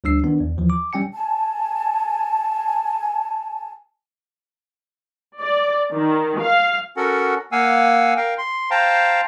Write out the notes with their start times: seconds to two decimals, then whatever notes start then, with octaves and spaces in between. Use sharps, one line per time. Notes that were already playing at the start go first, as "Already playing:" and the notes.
0.04 D2 G3 D4 E6 C7
0.24 D#3 B3 D4
0.40 E2
0.57 D#2 E3 F3
0.70 D6
0.93 G3 C#4 G5 G#5 C#7
1.14 G#5 A5
5.40 D5
5.93 D#3
6.41 F5
6.97 C#4 F#4 A4 A#4 F#5
7.52 A#3 F5 F#5 G#5 E6
8.17 A#4 F5 G5
8.38 C6
8.71 C5 F5 G5 A5 A#5